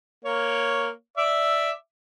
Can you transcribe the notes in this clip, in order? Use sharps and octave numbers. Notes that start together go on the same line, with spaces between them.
A#3 C#5
D5 E5 D6